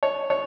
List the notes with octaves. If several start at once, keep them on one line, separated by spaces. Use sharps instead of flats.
C#5
C#5